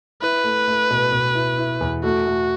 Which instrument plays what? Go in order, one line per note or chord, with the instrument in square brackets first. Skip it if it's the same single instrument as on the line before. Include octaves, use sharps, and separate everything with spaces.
[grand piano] E4 [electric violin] B4
[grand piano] A3
A3
B2
B2
E4
E4
E2
[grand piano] A3 [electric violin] F#4
[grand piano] A3